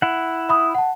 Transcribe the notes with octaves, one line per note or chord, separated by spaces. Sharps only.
E4 F#5
E5 B5 D#6
F#5 A5